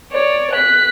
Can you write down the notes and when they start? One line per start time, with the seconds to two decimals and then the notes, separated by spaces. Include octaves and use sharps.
0.12 C#5 D5
0.53 F#6 B6